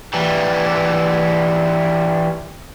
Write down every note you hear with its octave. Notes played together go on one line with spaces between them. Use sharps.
E3 G3